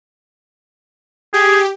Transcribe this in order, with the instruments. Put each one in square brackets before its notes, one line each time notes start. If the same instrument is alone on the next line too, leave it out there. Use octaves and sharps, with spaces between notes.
[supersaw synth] G4 [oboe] G#4